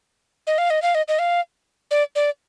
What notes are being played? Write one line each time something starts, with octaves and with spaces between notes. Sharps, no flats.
D#5
F5
D#5
F5
D#5
D#5
F5
D5
D5